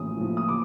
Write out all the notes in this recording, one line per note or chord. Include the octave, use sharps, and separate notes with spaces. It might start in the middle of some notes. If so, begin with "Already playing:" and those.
Already playing: A1 A2 F3 D#6
A2 F3
D#6
D6